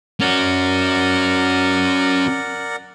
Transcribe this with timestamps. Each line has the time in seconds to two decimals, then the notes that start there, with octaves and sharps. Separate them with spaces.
0.21 C#4 F#4 A#4 D5 F#5